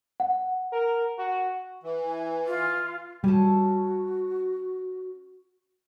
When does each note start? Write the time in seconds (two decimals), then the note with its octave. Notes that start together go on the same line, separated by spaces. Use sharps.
0.20 F#5
0.73 A#4
1.19 F#4
1.83 E3
2.05 G#5
2.46 F4
3.24 G3 C#4 F#4 A4